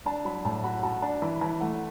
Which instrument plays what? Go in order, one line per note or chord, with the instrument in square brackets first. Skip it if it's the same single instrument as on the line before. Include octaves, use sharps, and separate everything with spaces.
[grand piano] D4 [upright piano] A5
[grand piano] F#3 [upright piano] B5
[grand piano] A2 [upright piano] A5
[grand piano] F#4 [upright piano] B5
[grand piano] F#4 [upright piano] A5
[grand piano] D4 [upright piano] A5
[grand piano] E3 [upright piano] B5
[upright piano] B5
[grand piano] E3 [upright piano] A5
[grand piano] A3 [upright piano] F#5